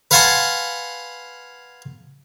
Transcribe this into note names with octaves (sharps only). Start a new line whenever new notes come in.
B4 F5 F#5 G#5 A5 C6